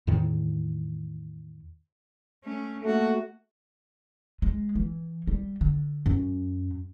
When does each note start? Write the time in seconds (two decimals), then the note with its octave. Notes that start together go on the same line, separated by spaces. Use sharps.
0.07 E2 A2 D#3 E3
2.44 A3 C#4
2.83 A3 A#3 F#4
4.42 G#3
4.76 E3
5.27 G3
5.61 D3
6.06 F#2